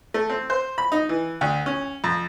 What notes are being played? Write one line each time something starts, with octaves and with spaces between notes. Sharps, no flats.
A3
C4
C5
B5
D#4
E3
D2
C#4
F2